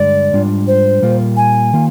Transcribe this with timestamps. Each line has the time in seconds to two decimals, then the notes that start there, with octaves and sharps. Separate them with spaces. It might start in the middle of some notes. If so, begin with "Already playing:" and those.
Already playing: G2 D3 G#3 D5
0.33 G#2 G3 D4 F4
0.67 C5
1.02 A#2 G3 A#3 F4
1.37 G#5
1.73 D#3 A#3 F4